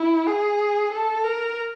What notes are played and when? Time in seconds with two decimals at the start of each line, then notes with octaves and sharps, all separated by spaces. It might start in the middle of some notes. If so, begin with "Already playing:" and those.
Already playing: E4
0.26 G#4
0.92 A4
1.24 A#4